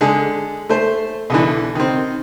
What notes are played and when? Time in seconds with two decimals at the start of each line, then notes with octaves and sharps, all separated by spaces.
0.01 D3 G#3 G#4
0.69 A3 C5
1.30 B1 D3 E3
1.75 D#3 C4